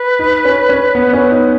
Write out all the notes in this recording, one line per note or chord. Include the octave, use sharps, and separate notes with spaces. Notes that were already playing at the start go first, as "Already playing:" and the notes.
Already playing: B4
D#4
C#4
C#4
B3
C#4
D#4